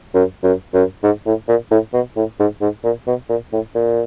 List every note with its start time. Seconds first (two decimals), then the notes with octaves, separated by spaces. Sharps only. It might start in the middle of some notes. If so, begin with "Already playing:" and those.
0.14 F#2
0.44 F#2
0.74 F#2
1.04 G#2
1.27 A2
1.49 A#2
1.71 A2
1.94 B2
2.17 A2
2.40 G#2
2.61 G#2
2.84 A#2
3.07 B2
3.29 A#2
3.53 A2
3.75 A#2